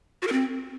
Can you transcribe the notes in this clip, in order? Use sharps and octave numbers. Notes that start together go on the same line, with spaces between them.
F#4
A#4
C4